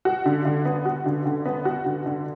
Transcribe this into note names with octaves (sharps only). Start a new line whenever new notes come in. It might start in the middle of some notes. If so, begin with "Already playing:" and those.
F#4
D3
D3
B3
F#4
D3
D3
B3
F#4
D3
D3